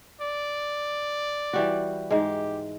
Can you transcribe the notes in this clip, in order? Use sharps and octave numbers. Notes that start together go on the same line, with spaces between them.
D5
E3 G3 F#4
G#2 G#3 G4